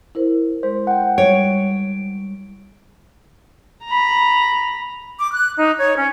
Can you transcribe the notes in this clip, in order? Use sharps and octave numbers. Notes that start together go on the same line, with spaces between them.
E4 A#4 C5
G#3 C5
F#5 G5
G3 C#5 D7
A#5 B5
D6
F#6
D#4
C#5
C#4